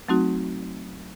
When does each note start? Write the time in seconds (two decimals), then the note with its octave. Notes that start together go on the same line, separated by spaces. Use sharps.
0.08 F#3 A3 C4 D#4 F#4